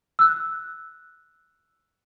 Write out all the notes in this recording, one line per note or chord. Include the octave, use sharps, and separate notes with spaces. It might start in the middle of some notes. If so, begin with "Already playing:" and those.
E6 F#6